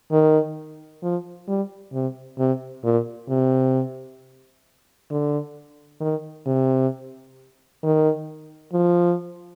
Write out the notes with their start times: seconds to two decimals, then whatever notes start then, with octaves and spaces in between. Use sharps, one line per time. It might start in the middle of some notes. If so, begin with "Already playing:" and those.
0.12 D#3
1.03 F3
1.48 G3
1.93 C3
2.39 C3
2.84 A#2
3.29 C3
5.11 D3
6.01 D#3
6.46 C3
7.83 D#3
8.73 F3